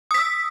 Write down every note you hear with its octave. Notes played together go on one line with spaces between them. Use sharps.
D#6 E6 B6